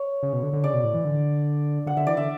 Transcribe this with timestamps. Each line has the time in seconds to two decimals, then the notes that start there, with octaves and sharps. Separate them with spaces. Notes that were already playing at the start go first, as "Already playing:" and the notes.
Already playing: C#5
0.23 C#3
0.33 B2
0.43 D3
0.53 D3
0.64 C#3 D5
0.74 B2
0.84 A2
0.94 E3
1.05 D3
1.86 D3 F#5
1.97 D3 E5
2.07 E3 D5
2.17 D3 E5